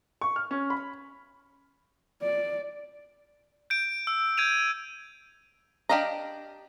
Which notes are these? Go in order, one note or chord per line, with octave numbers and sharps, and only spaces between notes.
C#6
F6
C#4
B5
D5
G6 D7
E6
G6 G#6 D7 D#7 F7
D4 G4 D#5 F5 A#5